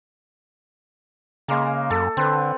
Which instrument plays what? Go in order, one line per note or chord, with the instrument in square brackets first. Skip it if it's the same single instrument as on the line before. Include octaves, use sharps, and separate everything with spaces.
[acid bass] C#3 [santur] G#3 A#3 A#5
[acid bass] F#2 [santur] A4
[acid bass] D3 [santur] C4 B4